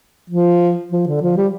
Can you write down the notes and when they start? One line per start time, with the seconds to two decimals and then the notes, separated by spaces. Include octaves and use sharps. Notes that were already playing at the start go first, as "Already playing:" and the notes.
0.30 F3
0.92 F3
1.07 D3
1.22 F3
1.37 G3